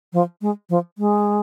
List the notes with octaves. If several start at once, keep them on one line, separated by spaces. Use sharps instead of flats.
F3
G#3
F3
G#3